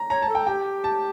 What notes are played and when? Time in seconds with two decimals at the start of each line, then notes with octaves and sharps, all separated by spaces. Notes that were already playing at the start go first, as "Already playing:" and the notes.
Already playing: A#5
0.10 C#5 A#5
0.22 A5
0.29 A4
0.35 G5
0.47 G4 G5
0.84 A5